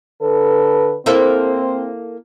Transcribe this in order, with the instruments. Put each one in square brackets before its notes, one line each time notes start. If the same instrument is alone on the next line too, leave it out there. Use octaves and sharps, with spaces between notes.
[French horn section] D3 A4 B4
[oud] A#3 E4 A4 [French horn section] C4 C5